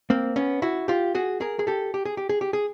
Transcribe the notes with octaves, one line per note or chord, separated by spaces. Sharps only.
A#3 C4
B3 C#4
E4 F#4
F4 G4
F#4 G#4
G#4 A#4
G#4
G4 A4
G4
G#4
G4
G#4
G4
G#4